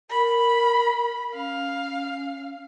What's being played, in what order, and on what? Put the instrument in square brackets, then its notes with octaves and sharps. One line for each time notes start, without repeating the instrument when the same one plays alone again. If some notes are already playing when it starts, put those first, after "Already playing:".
[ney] A#4 [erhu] B5
[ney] C#4 [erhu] F5